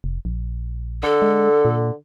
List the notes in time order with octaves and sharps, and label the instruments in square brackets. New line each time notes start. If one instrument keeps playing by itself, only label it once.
[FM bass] F1
A#1
[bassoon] D3 [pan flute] A4
[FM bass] G#3
A#2